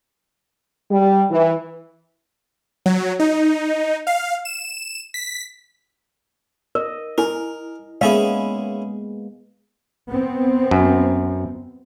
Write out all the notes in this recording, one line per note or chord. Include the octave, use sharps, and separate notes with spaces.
G3
E3
F#3
D#4
F5
E7
B6
A#4 D#5
E4 A#4 G#5
G#3 A#3 B3 C#4 E4 G#4 F5 G#5
B3 C4
F#2